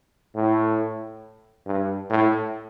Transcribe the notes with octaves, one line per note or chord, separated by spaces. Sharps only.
A2
G2
A2